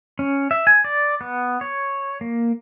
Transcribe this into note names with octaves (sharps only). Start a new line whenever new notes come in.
C#4
E5
G#5
D5
B3
C#5
A#3